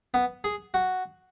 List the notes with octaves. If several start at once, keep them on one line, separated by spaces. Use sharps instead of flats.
B3
G#4
F#4